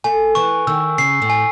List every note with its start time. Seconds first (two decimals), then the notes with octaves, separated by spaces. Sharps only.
0.04 A3 G#5
0.35 E3 C#6
0.67 D#3 E6
0.98 C#3 C7
1.22 A2
1.30 G#5